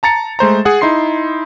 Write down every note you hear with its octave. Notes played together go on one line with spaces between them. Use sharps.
A5 A#5 A6 C#7
G#3 A3 C5 A#5
G#4 F#5
D#4 E4 C6 C7